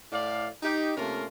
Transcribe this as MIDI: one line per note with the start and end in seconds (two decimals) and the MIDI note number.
0.12 0.47 45
0.12 0.47 74
0.12 0.47 77
0.63 0.93 63
0.63 0.93 67
0.97 1.25 48
0.97 1.25 57
0.97 1.25 58
0.97 1.25 61
0.97 1.25 65
0.97 1.25 70